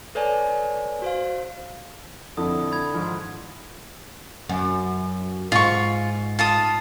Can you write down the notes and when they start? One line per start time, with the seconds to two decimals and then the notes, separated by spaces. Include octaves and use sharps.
0.15 A4 B4 C#5 D5 G#5
1.02 F#4 C5 F5
2.37 F2 D3 E4 D#6
2.72 B5 G#6
2.94 G#2 D#3 F3
4.49 F#2
5.52 G#2 F4 C#6
6.39 F4 A5 D#6